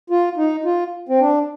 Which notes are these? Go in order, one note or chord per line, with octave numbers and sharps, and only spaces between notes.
F4
D#4
F4
C4
D4